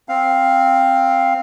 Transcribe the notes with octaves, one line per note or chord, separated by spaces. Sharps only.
C4 F5